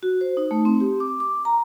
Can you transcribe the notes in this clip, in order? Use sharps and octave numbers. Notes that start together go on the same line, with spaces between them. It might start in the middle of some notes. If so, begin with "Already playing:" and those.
F#4
C5
D#4
A3
C4
G4
D6
D6
A#5